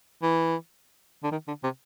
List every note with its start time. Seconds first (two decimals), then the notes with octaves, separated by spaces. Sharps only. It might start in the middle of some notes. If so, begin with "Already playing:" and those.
0.23 E3
1.23 D3
1.32 D#3
1.48 D3
1.64 C3